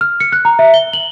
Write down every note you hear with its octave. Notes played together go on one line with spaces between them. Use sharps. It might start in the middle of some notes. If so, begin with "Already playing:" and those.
F6
C#7
F#6
A#5
E5
G7
F#7